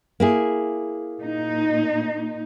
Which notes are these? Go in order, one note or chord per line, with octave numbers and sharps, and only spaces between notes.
A#3 E4 G#4
A#2 D#4